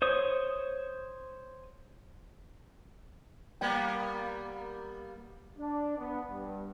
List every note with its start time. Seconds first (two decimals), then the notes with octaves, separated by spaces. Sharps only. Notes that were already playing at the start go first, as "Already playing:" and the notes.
0.02 C5 C#5 D#6
3.61 G3 A#3 B3 G5
5.58 D4
5.98 B3
6.29 G2